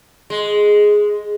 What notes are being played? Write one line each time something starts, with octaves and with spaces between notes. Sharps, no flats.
G#3